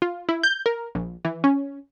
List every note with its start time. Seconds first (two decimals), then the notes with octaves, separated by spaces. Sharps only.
0.02 F4
0.29 E4
0.43 G6
0.66 A#4
0.95 A#1
1.25 E3
1.44 C#4